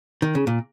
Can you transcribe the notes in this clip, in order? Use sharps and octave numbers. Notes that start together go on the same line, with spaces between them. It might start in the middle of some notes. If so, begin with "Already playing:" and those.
D#3
C#3
A#2